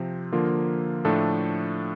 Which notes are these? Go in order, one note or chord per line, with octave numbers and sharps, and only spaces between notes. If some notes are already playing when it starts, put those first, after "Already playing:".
Already playing: C3 F3 C4
D3 F3 A#3 F4 A#4
A2 F3 A3 D4 A4